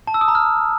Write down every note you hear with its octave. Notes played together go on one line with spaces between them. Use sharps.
A5
E6
D#6
A#5
F6